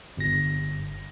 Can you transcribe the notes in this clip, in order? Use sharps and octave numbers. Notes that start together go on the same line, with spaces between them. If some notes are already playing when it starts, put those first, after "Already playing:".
G1 A#6